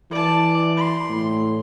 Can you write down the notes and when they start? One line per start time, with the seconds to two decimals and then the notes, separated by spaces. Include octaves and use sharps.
0.11 E3 D5 A5
0.77 C6
1.09 A2